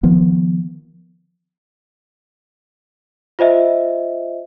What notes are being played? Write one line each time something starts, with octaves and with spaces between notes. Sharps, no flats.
D#3 F3 B3
F4 C5 D#5 E5